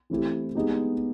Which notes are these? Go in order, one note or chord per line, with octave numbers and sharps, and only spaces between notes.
E3 A3 C4 E4 G4
G#3 B3 D#4 G4